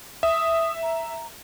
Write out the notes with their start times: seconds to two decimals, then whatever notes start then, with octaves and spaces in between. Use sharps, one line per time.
0.23 E5 D#6
0.83 A#5